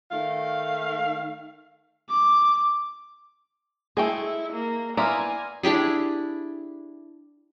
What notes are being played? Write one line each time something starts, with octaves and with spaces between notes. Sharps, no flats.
D#3 A3 F5
D6
G#3 A3 E4 G#4 G5
A#3
A#3 B3 E4 D5 G#5 A#5 C6 F6
D4 E4 G4 G#4